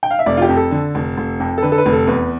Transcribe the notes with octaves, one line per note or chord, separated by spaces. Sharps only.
G5
F5
E5
F1 D5
F4
G4
F2
A4
D3
F1
F1
F2
A4
D3 B4
A4
B4
F1
A4
E2 B4